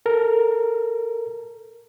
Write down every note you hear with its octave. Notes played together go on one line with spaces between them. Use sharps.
A4 A#4